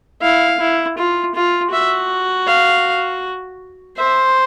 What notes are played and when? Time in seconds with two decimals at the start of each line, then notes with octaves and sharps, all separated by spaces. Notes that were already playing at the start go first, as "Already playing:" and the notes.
0.22 E4 F5
0.60 E4
0.98 F4
1.35 F4
1.72 F#4 E5
2.47 F5
3.98 C5 E5